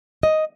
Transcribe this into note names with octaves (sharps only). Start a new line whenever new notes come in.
D#5